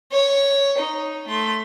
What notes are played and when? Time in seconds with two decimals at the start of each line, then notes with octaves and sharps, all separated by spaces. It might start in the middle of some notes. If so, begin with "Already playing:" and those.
0.12 C#5
0.78 D#4
1.27 A3 C6